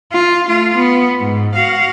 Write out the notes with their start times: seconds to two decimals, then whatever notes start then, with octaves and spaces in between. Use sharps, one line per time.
0.13 F4
0.48 A3 F4
0.77 B3
1.20 G#2
1.55 F#4 F5